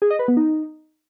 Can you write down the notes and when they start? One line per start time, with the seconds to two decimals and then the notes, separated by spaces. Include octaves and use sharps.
0.02 G#4
0.10 D#5
0.19 B4
0.28 B3
0.37 D#4